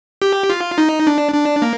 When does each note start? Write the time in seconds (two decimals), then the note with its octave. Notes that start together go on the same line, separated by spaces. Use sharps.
0.22 G4
0.50 F4
0.78 D#4
1.07 D4
1.34 D4
1.62 A#3